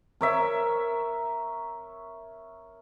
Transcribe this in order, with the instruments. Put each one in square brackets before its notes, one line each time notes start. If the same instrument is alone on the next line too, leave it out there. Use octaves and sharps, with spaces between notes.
[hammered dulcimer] A#4 C#5 E5